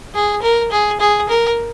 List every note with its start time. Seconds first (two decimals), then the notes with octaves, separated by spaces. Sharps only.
0.15 G#4
0.42 A#4
0.71 G#4
1.00 G#4
1.29 A#4